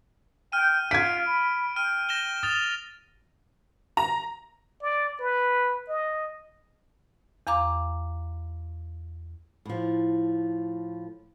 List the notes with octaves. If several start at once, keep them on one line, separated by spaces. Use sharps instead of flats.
G5 F6 D#7
F4 G#6 B6 D7
B5
G5 F6 D#7
A#6 E7 G7
D#6 A6 F7
A#5
D5
B4
D#5
E2 F5 A#5 D6
A2 F3